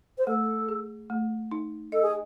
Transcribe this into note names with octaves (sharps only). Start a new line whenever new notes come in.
C5
A3 A4
G#4
A3
D#4
A4 D#5
G#4